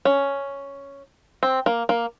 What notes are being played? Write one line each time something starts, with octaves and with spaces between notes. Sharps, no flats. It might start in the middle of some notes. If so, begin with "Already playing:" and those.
C#4
C4
A#3
A#3